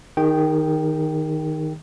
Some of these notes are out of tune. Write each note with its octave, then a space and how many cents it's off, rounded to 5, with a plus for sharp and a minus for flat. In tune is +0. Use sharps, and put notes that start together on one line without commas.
D#3 +0 G#4 -40 G5 -5